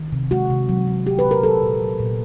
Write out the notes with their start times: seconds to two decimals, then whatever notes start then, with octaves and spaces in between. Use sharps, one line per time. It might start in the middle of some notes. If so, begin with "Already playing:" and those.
Already playing: D#3
0.12 C3
0.31 G#3 F#4
0.50 C3
0.69 F#3
0.88 F#3
1.06 A3 G4
1.19 B4
1.24 A#2
1.31 A#4
1.43 F#3 A4
1.63 A#2
1.81 F#3
1.99 A#2